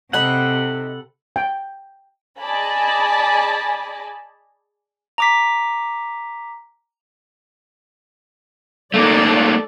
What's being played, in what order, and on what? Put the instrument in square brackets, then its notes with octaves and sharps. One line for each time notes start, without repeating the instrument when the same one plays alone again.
[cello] C3 [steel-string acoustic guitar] D#4 D#5 E5 [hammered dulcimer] A4 [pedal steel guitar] F#5 B5
[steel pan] G5
[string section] G#4 D5 D#5 G#5 A5 B5
[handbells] A#5 D6 B6
[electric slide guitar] A3 A#3 D#4 [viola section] A4 D5